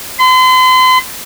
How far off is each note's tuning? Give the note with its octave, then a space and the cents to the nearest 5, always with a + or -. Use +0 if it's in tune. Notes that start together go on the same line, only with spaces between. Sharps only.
C6 -40